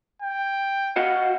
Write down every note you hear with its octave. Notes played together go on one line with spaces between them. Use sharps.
G5
F#4 D#5 F5 F#5